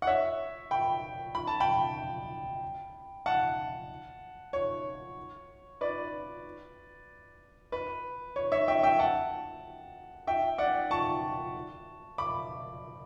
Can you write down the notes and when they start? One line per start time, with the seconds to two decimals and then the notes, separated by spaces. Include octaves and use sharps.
0.02 F#5
0.07 C#5 E5
0.71 G5 B5
1.35 B5
1.47 A5
1.60 G5 B5
3.26 F#5 A5
4.53 C#5
5.81 B4 D5
7.72 B4
8.36 C#5
8.52 C#5 E5
8.68 E5 G5
8.83 E5 G5
8.99 F#5 A5
10.27 E5 G5
10.58 D5 F#5
10.91 A5 C#6
12.18 B5 D6